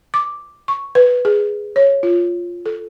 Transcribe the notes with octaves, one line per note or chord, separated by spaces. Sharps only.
D6
C#6
B4
G#4
C#5
F4
A4